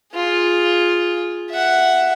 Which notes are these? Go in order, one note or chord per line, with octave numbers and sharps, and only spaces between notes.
F4 G#4
E5 F#5